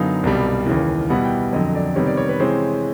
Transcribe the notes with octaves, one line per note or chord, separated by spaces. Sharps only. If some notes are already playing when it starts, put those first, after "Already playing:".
Already playing: F#2 D3 F#3 B3 D#4 F5
C2 B2 G3
D#2 C#3 E3
B2 G3 B3 E4 F#5
G5
F2 D3 F#3 D#5
D5
C3 D#3 G3 B3 C#5
D5
C#5
B4
C3 E3 G#3 C#4 C5